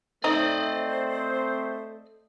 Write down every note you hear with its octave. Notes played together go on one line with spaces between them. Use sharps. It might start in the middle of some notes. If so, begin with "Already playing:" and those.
A3 C4 D#4 C5 D5 D#5